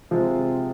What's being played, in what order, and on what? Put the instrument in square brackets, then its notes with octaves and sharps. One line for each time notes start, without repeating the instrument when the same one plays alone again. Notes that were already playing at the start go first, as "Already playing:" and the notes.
[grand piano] C3 F3 G#3 F4 C5 [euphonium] C4